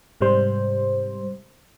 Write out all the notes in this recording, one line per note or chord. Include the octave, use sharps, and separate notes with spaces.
G#2 C3 G3 C5